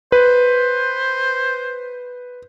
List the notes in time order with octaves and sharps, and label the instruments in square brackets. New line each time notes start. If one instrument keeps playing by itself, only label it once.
[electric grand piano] B4 [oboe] C5